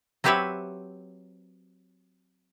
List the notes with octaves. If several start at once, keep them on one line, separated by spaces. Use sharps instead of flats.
F#3 C4 G4 B4 C#5 E5